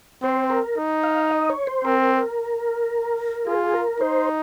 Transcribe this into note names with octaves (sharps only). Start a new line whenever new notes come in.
C4 C5
A#4
D#4
F5
D#5
C#5
C5
C4 A#4
F4 G#4
A#4
D#4 C5